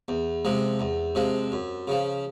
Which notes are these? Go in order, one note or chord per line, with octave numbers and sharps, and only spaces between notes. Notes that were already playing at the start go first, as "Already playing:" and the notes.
E2
C3 F3 G#3
E2
C3 F3 G#3
F#2
C#3 F3